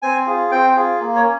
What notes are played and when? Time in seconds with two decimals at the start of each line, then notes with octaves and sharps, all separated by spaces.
0.02 C4 G#5
0.27 F4 G#4
0.51 C4 G5
0.76 F4 G#4
1.00 A#3
1.16 C#5
1.23 C#4